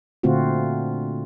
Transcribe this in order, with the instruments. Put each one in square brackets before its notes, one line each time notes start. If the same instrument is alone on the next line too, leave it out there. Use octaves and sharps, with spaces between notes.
[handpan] A#2 D3 A3 C4 F4 F#4